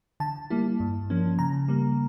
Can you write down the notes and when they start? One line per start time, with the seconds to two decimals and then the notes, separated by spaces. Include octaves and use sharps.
0.20 D3 A5
0.50 G3 A#3 E4
0.80 G2
1.10 F3 A#3 C#4
1.39 C#3 A#5
1.68 G3 A#3